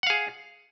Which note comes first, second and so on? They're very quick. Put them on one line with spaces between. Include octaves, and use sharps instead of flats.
F#5 F5 G#4